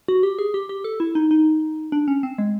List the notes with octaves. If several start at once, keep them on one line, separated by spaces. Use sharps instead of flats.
F#4
G4
G#4
G4
G4
A4
E4
D#4
D#4
D4
C#4
C4
G#3